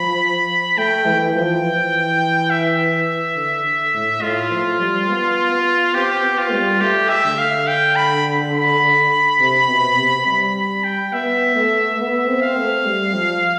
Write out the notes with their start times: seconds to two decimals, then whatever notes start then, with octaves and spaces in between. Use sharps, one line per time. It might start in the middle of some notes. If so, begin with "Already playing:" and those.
Already playing: F3 B5
0.77 A3 G5
1.06 E3
1.20 G5
1.35 F3
1.64 E3
2.50 E5
3.36 D3
3.94 A2
4.22 A2 F4
4.51 F3
4.80 G3
5.09 B3
5.52 B3
5.95 C4 G4
6.24 B3
6.38 F4
6.53 G3
6.81 A3 G4
7.09 E5
7.24 D3
7.38 F5
7.68 G5
7.96 B5
8.54 B5
9.40 C3
9.69 B2
9.97 C3
10.26 G3 B5
10.55 B5
10.84 G5
11.12 B3 E5
11.55 A3
11.99 B3 E5
12.28 C4
12.42 F5
12.56 A3
12.85 G3
13.14 F3